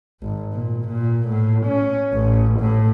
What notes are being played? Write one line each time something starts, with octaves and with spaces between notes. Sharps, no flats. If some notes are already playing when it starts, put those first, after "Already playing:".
G#1
A#2
A#2
A2
C#4
A1
A2